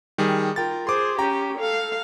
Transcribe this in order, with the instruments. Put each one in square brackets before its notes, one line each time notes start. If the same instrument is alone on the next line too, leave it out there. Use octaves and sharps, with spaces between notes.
[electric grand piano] D#3 G3 G#4
[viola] F4 A#4 [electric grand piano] G5 A6
[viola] G#4 C5 [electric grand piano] C6 D6
[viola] C#4 G4 [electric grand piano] G5 A#5
[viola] A4 F5